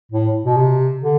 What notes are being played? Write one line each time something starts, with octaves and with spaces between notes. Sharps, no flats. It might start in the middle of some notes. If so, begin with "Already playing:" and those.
A2
B2
C3
D3